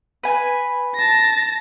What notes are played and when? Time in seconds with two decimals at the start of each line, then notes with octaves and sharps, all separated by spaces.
0.23 B4 G#5
0.95 A5 A#6